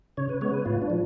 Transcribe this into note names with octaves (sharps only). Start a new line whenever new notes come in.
C#3 C#5
B4
G#3 B3 C#5
B4
A2 F4
D4
F3